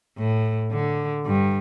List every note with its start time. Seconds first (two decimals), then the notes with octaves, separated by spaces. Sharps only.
0.18 A2
0.72 D3
1.26 G2